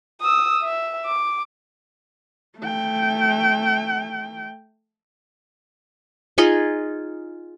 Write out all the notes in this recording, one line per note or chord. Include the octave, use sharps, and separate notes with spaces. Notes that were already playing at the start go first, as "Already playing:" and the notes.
D#6 E6
E5
D6
A3 G5
D#4 F4 G#4 D#5